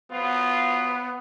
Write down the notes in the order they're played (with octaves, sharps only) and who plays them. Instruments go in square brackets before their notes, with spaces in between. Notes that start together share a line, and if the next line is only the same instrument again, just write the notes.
[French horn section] F3 F#3 F4 [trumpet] B3